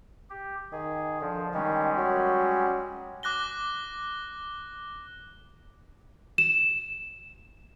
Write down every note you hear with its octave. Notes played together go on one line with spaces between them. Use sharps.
G4
D#3 G#4
D3 F3
D#3 G3 G#3 C#4
F#3
D6 F#6 A#6 G7
E7